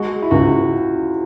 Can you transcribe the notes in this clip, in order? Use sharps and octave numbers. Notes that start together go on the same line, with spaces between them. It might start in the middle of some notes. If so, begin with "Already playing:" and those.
Already playing: G#3 F#4
E4
C#2 F#4